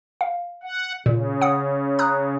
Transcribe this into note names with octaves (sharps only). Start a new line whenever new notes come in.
F5
F#5
A#2 C#3
F#5 D#6
A#5 D#6 F#6